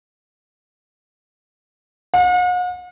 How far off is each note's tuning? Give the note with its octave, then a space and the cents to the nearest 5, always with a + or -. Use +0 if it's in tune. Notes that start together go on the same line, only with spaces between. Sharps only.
F#5 -45